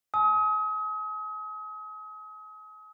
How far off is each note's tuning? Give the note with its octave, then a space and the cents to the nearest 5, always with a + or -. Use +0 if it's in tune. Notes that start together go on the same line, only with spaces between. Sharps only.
G#5 +40 D#6 +40